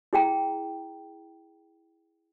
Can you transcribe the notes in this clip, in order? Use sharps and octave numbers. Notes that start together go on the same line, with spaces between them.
E4 G#4 G5 A#5